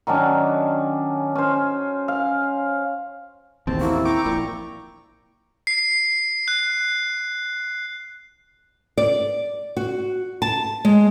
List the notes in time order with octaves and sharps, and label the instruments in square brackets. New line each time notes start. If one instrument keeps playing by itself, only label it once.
[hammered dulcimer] D#3 F#3 C#4 D4
C#4 C5
F5
[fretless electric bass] A1 D#2 C#3 [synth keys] C4 [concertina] A5
[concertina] A#3 F#4 [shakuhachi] E4
[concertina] G5 A#5 C#6 [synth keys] D6
[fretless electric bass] A#1 A#2
[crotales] C7
F#6
[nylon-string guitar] D5
F#4
A5
G#3